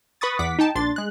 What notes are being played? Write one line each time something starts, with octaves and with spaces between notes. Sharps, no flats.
B4 B5 C#6 D#6 A6
E2 F#5 D6 B6
D#4 G5 A5
A#1 D4 C6 A6
G#3 F#6